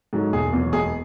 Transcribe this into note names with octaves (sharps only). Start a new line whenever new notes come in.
G#2 F#3 A3
E1 G#4
E2 B2 F#3
E1 G#4